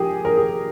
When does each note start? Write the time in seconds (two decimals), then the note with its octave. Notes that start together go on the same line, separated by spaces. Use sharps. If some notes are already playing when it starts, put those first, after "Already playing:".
Already playing: F3 G4 G#4 A#4 G#5
0.25 A#4
0.37 G#4